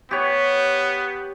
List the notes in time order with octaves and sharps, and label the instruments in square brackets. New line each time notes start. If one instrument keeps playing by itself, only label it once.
[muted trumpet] B3 [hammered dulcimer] G4 C#5